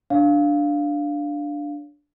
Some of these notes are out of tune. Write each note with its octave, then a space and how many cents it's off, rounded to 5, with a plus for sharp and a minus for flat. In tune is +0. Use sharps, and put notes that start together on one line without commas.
D4 +0 C#5 +15 F5 +0